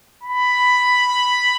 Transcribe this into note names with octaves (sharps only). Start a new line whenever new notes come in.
B5